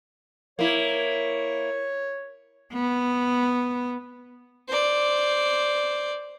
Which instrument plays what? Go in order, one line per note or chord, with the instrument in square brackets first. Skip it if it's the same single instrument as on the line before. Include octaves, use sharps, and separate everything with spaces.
[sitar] A#3 E4 [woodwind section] C#5
[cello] B3
[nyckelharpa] C5 D5